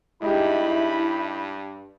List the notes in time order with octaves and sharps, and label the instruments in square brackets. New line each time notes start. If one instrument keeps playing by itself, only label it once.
[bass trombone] G2 [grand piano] G#3 D#4 G4 [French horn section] E4 [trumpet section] B5